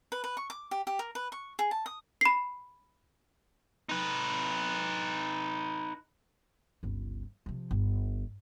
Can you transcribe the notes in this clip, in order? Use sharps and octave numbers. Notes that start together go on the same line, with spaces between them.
B4
B4
C#6
D6
G4
G4
A#4
B4
C#6
G#4
A5
D#6
B5 C7
D#4 B4
G1 C#2
C3 F3
G1